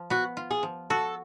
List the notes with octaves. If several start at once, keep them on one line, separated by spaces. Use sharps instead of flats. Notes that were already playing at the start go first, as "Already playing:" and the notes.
Already playing: F3
B3 F#4
F4
G#4
F3
F#4 A4